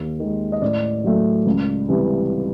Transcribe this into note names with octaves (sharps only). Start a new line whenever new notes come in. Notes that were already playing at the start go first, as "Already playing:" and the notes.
Already playing: D#2
D#3 G#3
D#5
A2 D5
F#3 A3
C#2
C3 E3 G3